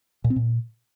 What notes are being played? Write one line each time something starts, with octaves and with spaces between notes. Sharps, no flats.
A#2
C4
A#2